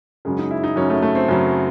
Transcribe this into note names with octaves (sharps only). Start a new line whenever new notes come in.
F#2 C#3 F#3 G#3
D#4
E4
D#4
F#2 C#3 F#3 C#4
A3
A3
C4
F#2 C#3 F#3